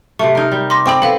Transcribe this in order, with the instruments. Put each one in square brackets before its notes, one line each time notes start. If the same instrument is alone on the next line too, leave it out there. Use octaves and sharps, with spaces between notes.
[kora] C3 A3 [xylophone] C#6
[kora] D#4 A#4
G3
[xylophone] C6 D6 A#6
[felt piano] C4 G5 D6 [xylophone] B5 C#6
[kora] B3 [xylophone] A4 F5